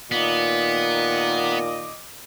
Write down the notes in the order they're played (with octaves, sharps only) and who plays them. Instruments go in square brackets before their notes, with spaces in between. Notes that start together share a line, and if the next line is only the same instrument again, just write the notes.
[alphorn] A#2 [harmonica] D#3 D#5 D6 [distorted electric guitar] B3